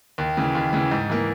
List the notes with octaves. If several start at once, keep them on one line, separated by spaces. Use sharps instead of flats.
D#2
C#3 E3
D#2
C#3 E3
G#2
E3 A#3